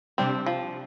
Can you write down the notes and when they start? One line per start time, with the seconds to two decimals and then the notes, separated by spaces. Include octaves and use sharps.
0.18 C3 G3 C4 D4
0.46 F3